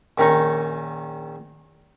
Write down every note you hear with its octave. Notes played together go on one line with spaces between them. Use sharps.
A#1 D#3 C#4 D#4 C#6